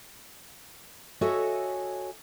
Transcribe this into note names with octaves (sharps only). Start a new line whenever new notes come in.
F#4 A4 C#5 D#5 E5 G#5